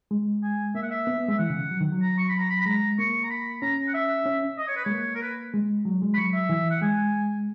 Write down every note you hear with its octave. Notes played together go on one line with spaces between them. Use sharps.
G#3
G#5
A#3 E5
F#5
E5
B3
B3
G#3 E5
E3 F#5
C#3
F#3
D#3
F#3
A#5
C#6
B5
A#5
B5
B5
G#3 A#5
A#3 C#6
A#5
B5
C#4 A#5
F#5
E5
C#4
D#5
C#5
B4
G#3 C#5
A#3
A#4
B4
G#3
F#3
G#3
B5
F#3 C#6
E5
E3
F#5
G#3 G#5